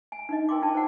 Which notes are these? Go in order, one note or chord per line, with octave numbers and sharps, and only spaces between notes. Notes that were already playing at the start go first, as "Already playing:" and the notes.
G#5
D4 D#4 D#5
A#4 G5 C6 D6
D4 F4 D5 G5 A5
C5 F#5